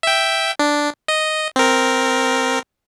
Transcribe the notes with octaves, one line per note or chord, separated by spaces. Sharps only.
E5 G5
D4
D#5
C4 A#4